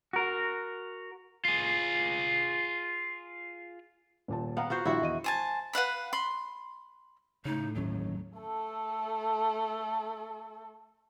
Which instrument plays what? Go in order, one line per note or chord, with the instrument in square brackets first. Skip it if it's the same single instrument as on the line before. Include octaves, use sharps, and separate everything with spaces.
[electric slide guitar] F#4 A#4
[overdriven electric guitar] F4 G#4
[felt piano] D#1 A#2 A5
[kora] B3 [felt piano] F5 F#5 A#5
[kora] F4 F#4 C5
[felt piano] A#1 G3 [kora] E4 F#4
[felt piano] E2 D#5 D#7
[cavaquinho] C5 G#5 A5
B4 F5 F#5 B5
B5 C6
[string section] A2 [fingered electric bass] C#3 [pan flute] D#4
[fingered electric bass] G1 D#2 C#4 [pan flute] F#3
[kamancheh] A3 A4